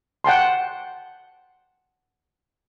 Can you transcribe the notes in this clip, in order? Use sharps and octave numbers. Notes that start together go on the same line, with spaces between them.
F#5 G5 A5 C6